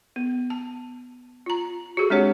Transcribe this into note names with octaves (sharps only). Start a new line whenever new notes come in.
B3
A5
F4 A#5
F#4 G#4 A4
G#3 C4 D4 G4 C#5 F#5